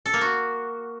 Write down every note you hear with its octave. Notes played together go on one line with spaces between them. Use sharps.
A4
A#3
F#4